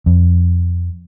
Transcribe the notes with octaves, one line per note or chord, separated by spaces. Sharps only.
F2